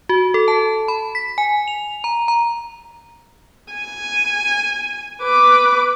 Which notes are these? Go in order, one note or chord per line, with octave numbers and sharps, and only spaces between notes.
F#4
A4
A5
B5
B6
G#5
F7
A#5
A#5
G#5
B4 D6